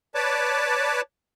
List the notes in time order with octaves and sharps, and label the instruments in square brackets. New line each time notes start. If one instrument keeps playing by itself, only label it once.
[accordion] B4 C#5 D5 A5 D6